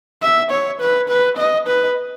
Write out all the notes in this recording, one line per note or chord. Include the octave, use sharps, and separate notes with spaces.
E5
C#5
B4
B4
D#5
B4